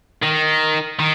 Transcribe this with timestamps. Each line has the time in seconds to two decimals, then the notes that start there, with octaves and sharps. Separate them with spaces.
0.22 D#3
0.99 D#3